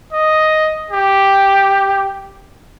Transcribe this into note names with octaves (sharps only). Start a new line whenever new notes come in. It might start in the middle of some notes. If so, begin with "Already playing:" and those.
D#5
G4